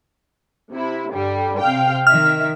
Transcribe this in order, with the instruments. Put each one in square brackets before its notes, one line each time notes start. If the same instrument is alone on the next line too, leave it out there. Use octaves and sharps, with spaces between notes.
[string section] C3 E4
G2 D3 G3
C3 F5 G5
[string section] D#3 E5 [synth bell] F6